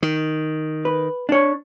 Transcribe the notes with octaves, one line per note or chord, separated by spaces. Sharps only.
D#3
B4
D4 C#5